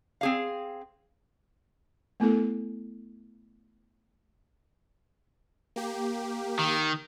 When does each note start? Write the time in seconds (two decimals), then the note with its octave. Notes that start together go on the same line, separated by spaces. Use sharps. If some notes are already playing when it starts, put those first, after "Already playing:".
0.21 C4 G#4 F5
2.20 A3 B3 E4 A4
5.76 A#3 G4
6.59 D#3